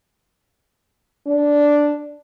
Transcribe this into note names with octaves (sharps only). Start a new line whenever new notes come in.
D4